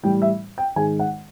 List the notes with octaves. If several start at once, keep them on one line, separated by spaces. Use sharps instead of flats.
A2 E3 G3 G5
E5
G5
G#2 D#3 G#3 G#5
F#5